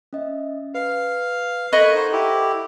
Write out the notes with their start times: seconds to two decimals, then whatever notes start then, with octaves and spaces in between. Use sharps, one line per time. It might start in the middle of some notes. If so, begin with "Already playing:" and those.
0.13 C#4 D#5 E5
0.75 B4 F5
1.73 A4 A#4 D#5 B5 C#6 F#6 G#6
1.95 D#4 A4 C5 F#5 C#6
2.12 E4 G4